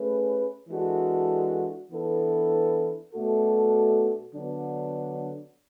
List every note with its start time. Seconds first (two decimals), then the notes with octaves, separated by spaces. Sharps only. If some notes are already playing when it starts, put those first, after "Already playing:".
Already playing: A3 C#4 G#4 B4
0.68 E3 G#3 D4 F#4 A4
1.90 E3 B3 D4 A4
3.13 B2 A3 D4 F#4 A4
4.34 D3 F#3 B3 D4